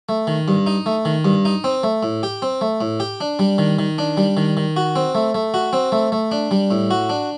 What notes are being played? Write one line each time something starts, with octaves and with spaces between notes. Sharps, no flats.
A3
D#3
G2
D#4
A3
D#3
G2
D#4
C4
A3
A2
G4
C4
A3
A2
G4
D4
G3
D#3
D#3
D4
G3
D#3
D#3
F#4
C4
A3
A3
F#4
C4
A3
A3
D4
G3
A2
F#4
D4